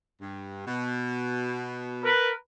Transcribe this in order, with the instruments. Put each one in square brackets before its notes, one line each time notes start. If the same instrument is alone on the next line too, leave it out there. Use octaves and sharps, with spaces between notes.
[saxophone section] G2
B2
[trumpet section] A#4 B4